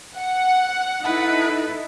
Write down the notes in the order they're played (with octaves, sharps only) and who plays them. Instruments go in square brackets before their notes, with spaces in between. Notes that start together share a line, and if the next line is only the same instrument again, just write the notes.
[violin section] F#5
[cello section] D#4 E4 A4 [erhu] B4